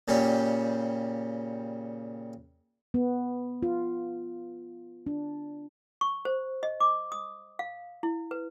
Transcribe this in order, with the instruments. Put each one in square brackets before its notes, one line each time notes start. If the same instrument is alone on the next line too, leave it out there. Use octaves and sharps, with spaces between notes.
[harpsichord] A#2 C#3 G3 G4
[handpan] B3
F4
D4
[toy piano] C#6
C5
D#5
D6
D#6
F5
E4
B4